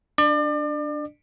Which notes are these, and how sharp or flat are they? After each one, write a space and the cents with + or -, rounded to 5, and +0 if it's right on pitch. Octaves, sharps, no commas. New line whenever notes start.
D4 +0 D5 +35